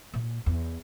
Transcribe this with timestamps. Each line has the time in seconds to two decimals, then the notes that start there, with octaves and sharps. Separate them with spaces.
0.14 A#2
0.46 E2